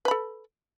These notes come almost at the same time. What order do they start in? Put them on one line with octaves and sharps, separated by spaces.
B4 B5 A4